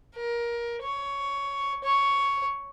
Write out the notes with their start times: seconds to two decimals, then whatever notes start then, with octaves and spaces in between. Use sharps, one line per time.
0.16 A#4
0.82 C#5
1.83 C#5